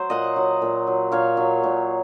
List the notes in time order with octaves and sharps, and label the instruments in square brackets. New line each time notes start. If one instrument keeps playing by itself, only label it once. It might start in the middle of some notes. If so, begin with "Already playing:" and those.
Already playing: [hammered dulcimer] F#3 C5
A#2 D#5 F#5
F#3
A#2
F#3
A#2 C#5 F5
F#3
A#2